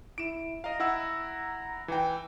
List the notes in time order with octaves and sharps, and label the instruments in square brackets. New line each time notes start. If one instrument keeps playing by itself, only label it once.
[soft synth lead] E4 [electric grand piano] D7 E7
[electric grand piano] D#5 F5 [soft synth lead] A#5
[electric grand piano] E4 F#5 E6
E3 G5